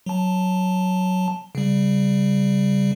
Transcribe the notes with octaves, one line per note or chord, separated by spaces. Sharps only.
F#3 A5
C#3 G3